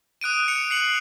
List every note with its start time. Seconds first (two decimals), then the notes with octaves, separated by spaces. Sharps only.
0.21 D#6 F#6 D7 D#7
0.48 C#7 F7
0.70 C7 C#7 F#7